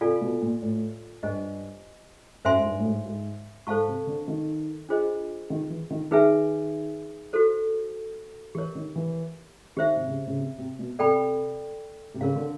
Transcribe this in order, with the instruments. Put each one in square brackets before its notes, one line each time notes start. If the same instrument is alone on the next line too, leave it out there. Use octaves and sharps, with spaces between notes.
[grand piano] C3 [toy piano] F4 A4 D5 F5 G#5
[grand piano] B2
A#2
A2
[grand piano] G2 [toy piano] G4 C5 D#5 G#5
[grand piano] F#2 [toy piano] C5 E5 G#5 C6
[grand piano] G#2
G2
A2
G#2
G#2
[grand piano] G#2 [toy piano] A4 C5 F5 A5 C#6
[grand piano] C3
D3
D#3
[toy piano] D4 F4 G#4 C5 D#5
[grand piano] D#3
E3
D#3
[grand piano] D#3 [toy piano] D#4 G#4 B4 E5 G#5
[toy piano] F#4 A4 C5
[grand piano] E3 [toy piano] G4
[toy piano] A#4 C#5
[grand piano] D#3
E3
[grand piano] D#3 [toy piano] G4 C5 E5
[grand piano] C3
C#3
C#3
C3
C3
B2
[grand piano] C3 [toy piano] A4 D5 G5 B5
[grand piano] C3
[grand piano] C#3 [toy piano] G4 A#4 C#5 F5
[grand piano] D3